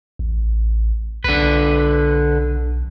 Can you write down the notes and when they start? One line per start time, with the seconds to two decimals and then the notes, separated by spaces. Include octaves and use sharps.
0.19 A1
1.24 B1 D3 B4